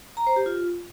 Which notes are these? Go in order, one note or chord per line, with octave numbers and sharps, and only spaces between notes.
A#5
C5
G4
F4